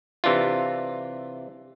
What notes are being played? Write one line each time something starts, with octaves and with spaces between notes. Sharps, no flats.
C3 E3 D4 F4